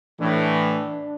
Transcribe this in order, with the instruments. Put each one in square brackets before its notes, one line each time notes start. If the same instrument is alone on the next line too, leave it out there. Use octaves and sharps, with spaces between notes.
[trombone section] A2 E3 [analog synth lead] D4